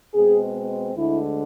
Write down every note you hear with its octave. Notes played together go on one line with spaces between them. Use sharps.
B2 G#3 C4 G#4
D2 D3 G#3 E4